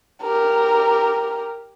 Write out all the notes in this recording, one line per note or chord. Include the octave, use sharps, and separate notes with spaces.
G4 A#4